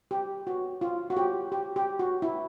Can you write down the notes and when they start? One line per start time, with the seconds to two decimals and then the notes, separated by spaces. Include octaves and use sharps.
0.11 G4
0.47 F#4
0.81 F4
1.10 F#4
1.17 G4
1.52 G4
1.76 G4
1.99 F#4
2.22 E4